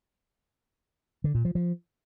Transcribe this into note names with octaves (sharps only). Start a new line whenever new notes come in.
D3
A#2
F3
F3